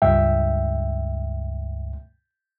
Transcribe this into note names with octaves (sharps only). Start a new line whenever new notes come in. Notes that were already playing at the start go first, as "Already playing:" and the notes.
C#2 G2 E5 G5